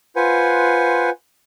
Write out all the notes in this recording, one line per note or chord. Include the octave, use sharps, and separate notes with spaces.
F4 B4 C5 F#5 G#5